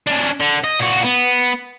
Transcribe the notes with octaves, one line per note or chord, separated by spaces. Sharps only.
C#4 D4
D3
D#5
A#2 F#4
B3